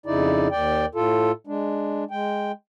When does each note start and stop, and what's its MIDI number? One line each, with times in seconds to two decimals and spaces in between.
0.06 0.48 41
0.06 0.48 49
0.06 0.48 63
0.06 0.48 64
0.06 0.48 74
0.51 0.86 39
0.51 0.86 74
0.51 0.86 79
0.95 1.32 45
0.95 1.32 65
0.95 1.32 69
1.47 2.04 56
1.47 2.04 62
2.11 2.52 56
2.11 2.52 79